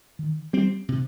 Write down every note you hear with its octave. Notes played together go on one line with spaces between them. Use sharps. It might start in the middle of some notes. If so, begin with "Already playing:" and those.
D#3
G3 C4
C3